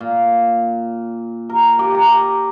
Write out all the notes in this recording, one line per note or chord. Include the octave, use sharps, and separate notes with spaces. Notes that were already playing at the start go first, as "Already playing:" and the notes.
A#2
A#4
G4
A#5